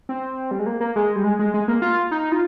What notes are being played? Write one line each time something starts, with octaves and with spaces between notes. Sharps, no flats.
C4
G3
G#3
A#3
A#3
G#3
G3
G#3
G#3
G#3
A#3
F4
D#4
F4